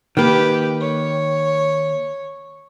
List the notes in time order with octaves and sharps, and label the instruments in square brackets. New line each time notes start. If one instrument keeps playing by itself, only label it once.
[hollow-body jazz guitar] D#3 A#3 [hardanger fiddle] G4 B4
[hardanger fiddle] C#5